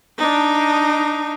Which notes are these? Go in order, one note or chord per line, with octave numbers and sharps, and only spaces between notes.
D4 D#4